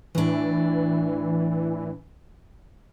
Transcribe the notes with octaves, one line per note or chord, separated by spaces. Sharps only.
A2 E3 D4